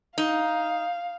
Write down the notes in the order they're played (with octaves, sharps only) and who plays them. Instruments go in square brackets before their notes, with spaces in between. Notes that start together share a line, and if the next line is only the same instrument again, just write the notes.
[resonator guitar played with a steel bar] D#4 [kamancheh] F5